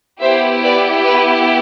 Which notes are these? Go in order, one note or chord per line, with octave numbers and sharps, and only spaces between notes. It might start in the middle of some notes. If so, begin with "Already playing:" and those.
B3 E4 G4 C5 E5
B4 D5
B4